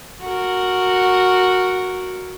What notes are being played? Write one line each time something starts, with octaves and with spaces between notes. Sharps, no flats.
F#4 A#4